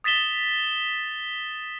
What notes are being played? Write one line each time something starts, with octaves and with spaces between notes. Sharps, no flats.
D#6 A6 B6 E7 G7